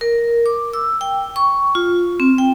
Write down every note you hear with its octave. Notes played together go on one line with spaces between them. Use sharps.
A#4
D6
E6
G5
C#6
F4
C4
G5